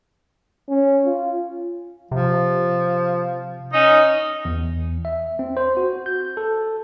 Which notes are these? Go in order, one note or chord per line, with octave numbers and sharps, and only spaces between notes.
C#4
F4
C3 F3
C#4 D#4
E2
E5
C4
C5
F#4
G6
A4